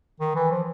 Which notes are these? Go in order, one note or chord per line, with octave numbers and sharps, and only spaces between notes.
D#3
E3
F3